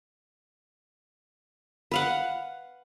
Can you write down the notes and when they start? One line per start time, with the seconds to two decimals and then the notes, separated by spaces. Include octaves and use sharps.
1.92 B4 F5 F#5